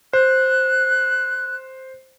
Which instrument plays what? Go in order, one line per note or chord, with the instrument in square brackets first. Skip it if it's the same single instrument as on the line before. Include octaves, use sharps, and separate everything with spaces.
[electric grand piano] C5 [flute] F#6